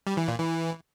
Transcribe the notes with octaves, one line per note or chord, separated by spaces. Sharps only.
G3
E3
A#2
E3